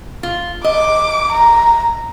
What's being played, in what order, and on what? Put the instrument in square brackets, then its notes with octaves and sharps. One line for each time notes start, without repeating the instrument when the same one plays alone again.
[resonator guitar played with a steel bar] F4
[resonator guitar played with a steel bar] D#5 [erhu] D6
[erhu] A#5